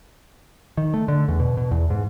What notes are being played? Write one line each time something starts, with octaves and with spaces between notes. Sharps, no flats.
D#3
A3
D3
E2
B2
B2
E2
G#2